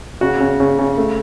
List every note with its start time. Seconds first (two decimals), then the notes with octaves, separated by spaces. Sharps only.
0.21 C#3 F#4
0.40 C#3
0.60 C#3
0.79 C#3
0.97 A3